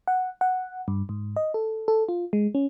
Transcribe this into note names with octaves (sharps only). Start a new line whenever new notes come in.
F#5
F#5
G2
G#2
D#5
A4
A4
F4
G#3
C#4